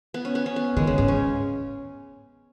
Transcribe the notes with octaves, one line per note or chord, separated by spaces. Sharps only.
B3
C#4
B3
C#4
B3
D#3 G#3
C#3
G#2 C#3
C#4